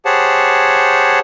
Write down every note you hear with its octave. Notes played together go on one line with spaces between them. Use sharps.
G4 G#4 C5 C#5 F#5 A5